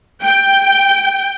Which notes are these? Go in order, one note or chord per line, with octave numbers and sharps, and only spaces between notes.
G5